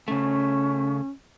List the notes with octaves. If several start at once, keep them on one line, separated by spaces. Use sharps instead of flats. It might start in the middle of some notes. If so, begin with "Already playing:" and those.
C#3 A3 C#4